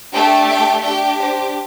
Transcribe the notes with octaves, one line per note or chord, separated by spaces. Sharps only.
A3 D4 G4 G5
G5
D4 G4 G5
C5